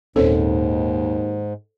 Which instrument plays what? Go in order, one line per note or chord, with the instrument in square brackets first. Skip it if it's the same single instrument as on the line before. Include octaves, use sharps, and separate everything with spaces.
[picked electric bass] D#1 C4 C#4 [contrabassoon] D#2 [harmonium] G#2 [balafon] A4 C5 C#5